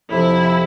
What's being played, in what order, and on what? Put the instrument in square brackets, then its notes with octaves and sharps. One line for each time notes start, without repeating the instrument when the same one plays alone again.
[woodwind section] F2 C3 F3 [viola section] E4